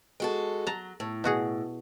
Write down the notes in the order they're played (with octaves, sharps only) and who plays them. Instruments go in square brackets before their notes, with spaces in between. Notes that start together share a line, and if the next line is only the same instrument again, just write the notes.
[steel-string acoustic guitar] G#3 F#4 A4
[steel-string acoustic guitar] F#3 [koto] A5 A#5
[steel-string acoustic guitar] A2
[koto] B2 F#4 G#4